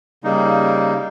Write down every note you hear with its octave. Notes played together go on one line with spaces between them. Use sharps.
C#3 G3 A#3 D#4